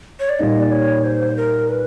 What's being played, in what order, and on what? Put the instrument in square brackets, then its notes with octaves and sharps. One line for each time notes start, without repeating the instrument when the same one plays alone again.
[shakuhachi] C#5
D5
[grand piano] A#2 G3 A#3 D#4 [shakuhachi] D#5
[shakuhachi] D5
C#5
C5
A#4
B4